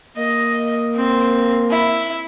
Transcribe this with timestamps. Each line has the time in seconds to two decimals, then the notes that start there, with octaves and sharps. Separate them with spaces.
0.17 A#3 D#5
0.95 C4
1.71 E4